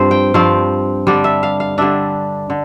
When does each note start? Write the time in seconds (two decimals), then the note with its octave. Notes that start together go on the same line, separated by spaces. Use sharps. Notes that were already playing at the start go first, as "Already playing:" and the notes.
Already playing: G2 F3 C4 C5
0.11 G5
0.34 G2 F3 C4 F5
1.07 D3 G3 D4
1.24 E5
1.43 F5
1.60 F5
1.78 D3 G3 D4 E5
2.50 D3